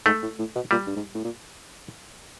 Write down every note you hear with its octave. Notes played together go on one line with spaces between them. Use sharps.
G#2 A3
A2
A2
B2
A#2 G3
G2
G#2
A2
A#2